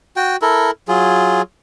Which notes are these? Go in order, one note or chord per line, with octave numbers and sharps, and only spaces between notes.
F#4 G5
E4 A4 A#4
F#3 F4 G#4